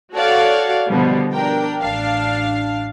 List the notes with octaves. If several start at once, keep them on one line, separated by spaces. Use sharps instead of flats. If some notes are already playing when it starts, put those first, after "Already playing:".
F#4 A4 C#5 D5 F5 F#5
B2 D3 F3 G3 B3
D4 A#4 G5
A1 D4 F5